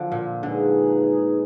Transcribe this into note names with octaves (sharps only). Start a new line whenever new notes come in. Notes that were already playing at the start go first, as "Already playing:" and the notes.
Already playing: D3 F3
A#2
D3 G#3 D#4 G#4 B4